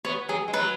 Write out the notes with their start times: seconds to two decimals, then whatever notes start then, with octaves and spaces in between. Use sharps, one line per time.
0.04 B3 C#5
0.29 F#3 G#4
0.48 G#3
0.53 F#3 B4